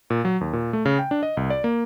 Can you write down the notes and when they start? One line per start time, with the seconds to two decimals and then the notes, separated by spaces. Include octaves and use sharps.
0.10 A#2
0.25 F#3
0.41 D#2
0.53 A#2
0.73 A3
0.85 C#3
0.99 G5
1.11 D4
1.23 D#5
1.37 C2
1.50 D5
1.64 A#3